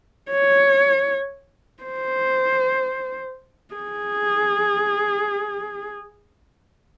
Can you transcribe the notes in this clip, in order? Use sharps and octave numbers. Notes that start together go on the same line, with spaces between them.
C#5
C5
G#4